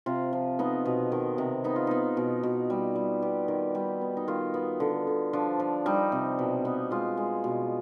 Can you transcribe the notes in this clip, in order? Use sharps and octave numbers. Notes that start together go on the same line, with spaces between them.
C3 F4
F3
B3 D#4
B2
D#3
C3
B3 D#4
F4
B3 D#4
B2
B2
G3
G3
B3 G4
D#3
G3
B3
D#4
D#3 F4
B3
D3
D3
F3 D4
F3
G3 D#4
C3
B2
B3
G#3 F4
G#3
B2